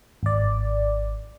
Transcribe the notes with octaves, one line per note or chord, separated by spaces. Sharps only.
G#1 D5